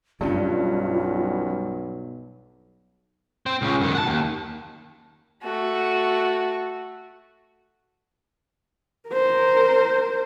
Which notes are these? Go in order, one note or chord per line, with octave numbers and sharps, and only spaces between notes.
B1 G2 G3 A#3 C#4 F4
C4 C5
C#2 C#3
F#2 D#3
F#5 A5
D#2
A3 F#4
A#4 C5